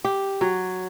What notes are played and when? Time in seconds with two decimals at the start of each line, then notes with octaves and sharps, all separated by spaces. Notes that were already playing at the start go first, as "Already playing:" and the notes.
0.05 G4
0.41 F#3